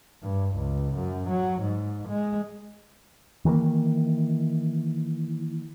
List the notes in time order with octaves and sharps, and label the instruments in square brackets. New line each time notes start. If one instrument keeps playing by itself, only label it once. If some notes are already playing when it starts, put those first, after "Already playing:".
[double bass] G2
C#2
F#2
F#3
G#2
G#3
[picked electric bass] D#3 E3 G3 A#3